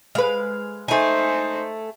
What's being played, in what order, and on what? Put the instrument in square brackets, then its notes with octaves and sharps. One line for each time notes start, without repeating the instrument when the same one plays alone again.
[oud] G#3 B4 [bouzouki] F5
[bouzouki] A3 G#5 [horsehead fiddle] D#4 C5